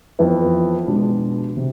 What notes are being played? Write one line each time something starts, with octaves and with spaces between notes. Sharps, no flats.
F2 E3 B3 E4 B4
B2 G#3 D4
C3